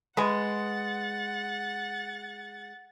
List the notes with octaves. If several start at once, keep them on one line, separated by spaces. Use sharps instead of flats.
G#3 B4 D#5 F#5 G#5 A6